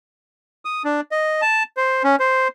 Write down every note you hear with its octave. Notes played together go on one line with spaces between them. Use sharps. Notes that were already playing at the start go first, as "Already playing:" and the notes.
D#6
D4
D#5
A5
C5
C#4
C5